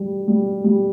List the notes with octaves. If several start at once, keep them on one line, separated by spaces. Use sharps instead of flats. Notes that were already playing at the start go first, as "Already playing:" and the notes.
Already playing: G3
G3
G3